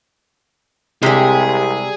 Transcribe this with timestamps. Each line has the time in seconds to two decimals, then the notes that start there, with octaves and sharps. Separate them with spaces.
1.03 C2 C3 G3 G#3 G4 G#4 G#5